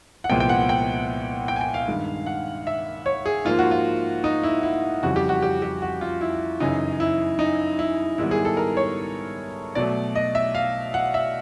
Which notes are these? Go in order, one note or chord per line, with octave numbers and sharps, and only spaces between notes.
F#5
C2 A#2 F3 G#3 B3 G5
G5
F#5
G5
G5
G#5
G5
F5
G2 D#3 G#3
F#5
E5
C#5
G#4
G#2 F3 A#3 F4
F#4
F4
D#4
E4
E4
F2 C#3 E3 G3 F#4
G4
F#4
G4
G4
F#4
F4
E4
F#2 C#3 E3 D#4
E4
D#4
E4
G#2 D#3 G3 B3 E4
G#4
A4
A#4
C#5
B2 F#3 A3 D5
D#5
E5
F5
F#5
E5